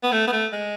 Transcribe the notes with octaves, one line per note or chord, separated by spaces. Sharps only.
B3
A3
B3
A3
G#3